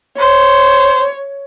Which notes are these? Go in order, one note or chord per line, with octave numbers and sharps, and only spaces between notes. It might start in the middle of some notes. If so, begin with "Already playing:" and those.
C5 C#5